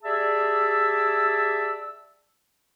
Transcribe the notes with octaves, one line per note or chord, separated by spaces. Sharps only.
G4 G#4 D5 E5 A5 E6